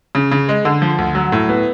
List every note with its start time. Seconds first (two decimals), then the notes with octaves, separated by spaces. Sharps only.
0.15 C#3
0.31 C#3
0.49 G#3
0.65 D3
0.82 F3
0.98 D2
1.15 F#3
1.32 A2
1.49 B3